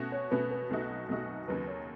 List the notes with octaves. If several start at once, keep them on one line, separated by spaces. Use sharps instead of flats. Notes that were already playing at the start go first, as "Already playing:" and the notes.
Already playing: B2 A3 C#4 F#4
C#5
B2 A3 C#4 F#4 B4
B4
B1 B2 A3 D#4 F#4
B1 B2 A3 D#4 F#4
D#2 C#3 F#3 B4
C#5